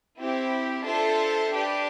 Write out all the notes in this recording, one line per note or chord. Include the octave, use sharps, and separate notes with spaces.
C4 E4 G4
D4 F4 A4 C5 E5
D4 G4 B4